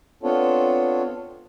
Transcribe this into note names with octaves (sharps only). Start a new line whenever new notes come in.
B3 C4 D4 F4 A4 C#5